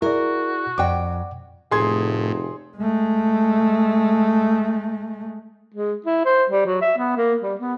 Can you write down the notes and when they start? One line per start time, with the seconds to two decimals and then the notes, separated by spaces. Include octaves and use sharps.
0.02 E4 F#4 G#4 A#4 D5
0.78 F2 D5 F#5 G5 D6
1.71 F1 A2 G#4 C6 G#6
2.78 G#3 A3
5.74 G#3
6.06 E4
6.25 C5
6.50 G3
6.66 F#3
6.82 E5
6.98 B3
7.17 A#3
7.43 G3
7.59 B3